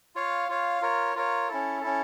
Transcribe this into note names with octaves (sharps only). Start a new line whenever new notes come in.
F4 C#5 F5
F4 C#5 F5
F4 A#4 C#5
F4 A#4 C#5
C#4 E4 A4
C#4 E4 A4